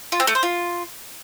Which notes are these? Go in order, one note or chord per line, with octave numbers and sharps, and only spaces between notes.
F4
C4
A3
C5
F4